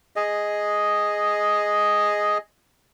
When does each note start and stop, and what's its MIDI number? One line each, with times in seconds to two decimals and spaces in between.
0.16 2.38 68
0.16 2.38 75